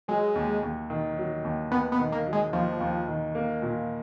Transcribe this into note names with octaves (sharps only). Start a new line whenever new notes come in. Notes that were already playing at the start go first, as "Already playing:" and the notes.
F#3 G#3
D#2
D#2
D#3
F#3
D#2
D#2 B3
B3
D#3
A#3
F#3
G#3
D#2 F3
D#2
D#3
A#3
A#2